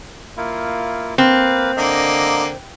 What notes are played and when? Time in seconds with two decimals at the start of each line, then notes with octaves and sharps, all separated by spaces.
0.37 A#3 E4 F4
1.18 A#3 C4 B4 F5
1.77 D3 A#3 D#5